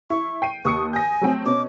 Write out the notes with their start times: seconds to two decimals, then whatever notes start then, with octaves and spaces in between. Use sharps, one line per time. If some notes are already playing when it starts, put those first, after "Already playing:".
0.10 E4 C#6
0.42 G5 C7 D#7
0.65 D#2 C#6 D#6 C#7
0.93 G#5 G6 A#6
1.21 F#3 A3 C4
1.46 B2 C#4 D6